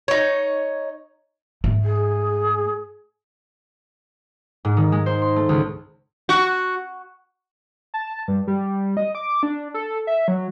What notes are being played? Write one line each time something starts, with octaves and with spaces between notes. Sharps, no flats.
D#4 C#5
G#2 A3
G#4
G#2
D#3
G#3
C5
C6
A3
C#2
F#4
A5
G2
G3
D#5
D6
D4
A4
E5
F#3